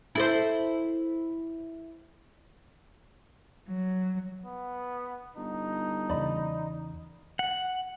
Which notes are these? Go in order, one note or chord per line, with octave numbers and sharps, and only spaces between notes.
E4 A4 C5
F#3
B3
G1 D#4
E2 C#3 D5 D#5 B5
F#5